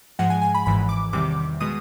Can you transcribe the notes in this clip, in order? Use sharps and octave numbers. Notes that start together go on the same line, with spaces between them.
G#2 F3 G#3 F#5
G#5
G#5
B5
G#1 G#2 E3 B5
D6
E2 C3 D#3 G3 D6
B2 G#3 D#6